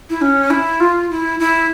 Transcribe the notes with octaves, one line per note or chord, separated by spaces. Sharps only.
E4
C#4
E4
F4
E4
E4